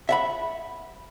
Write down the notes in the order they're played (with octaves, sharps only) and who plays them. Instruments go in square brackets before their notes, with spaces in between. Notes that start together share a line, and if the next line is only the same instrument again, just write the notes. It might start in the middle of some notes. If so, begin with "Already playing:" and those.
[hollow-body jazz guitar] E5 F#5 B5